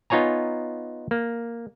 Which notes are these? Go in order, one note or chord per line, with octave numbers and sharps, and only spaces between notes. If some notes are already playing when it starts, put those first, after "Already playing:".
B3 D#4 F4 C#5 G#5 A#5
A#3